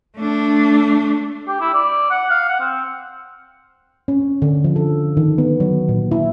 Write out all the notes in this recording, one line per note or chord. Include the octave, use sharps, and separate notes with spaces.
A3 D4
G4
E4
D5
F#5
F5
F#5
C4
C#4
D3
F3
A4
D#3
B3
F#3
A#2
E4